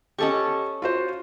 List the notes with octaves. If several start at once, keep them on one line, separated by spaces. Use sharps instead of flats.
C#4 G4 A4 D#5 A5 C#6
F4 F#4 C5